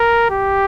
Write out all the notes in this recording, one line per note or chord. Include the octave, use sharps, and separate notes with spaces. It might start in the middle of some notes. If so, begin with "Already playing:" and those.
Already playing: A#4
G4